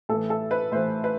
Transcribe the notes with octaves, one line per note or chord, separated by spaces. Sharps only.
A2 E3 A4
A4
B4
A2 E3 C5
B4